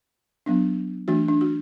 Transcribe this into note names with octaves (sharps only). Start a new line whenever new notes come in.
F#3 B3 D4
E3 A3 D4 F#4
D4
F#4